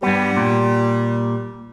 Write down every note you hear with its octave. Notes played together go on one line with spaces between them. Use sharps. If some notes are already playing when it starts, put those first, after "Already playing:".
G2 G3 B3
A#2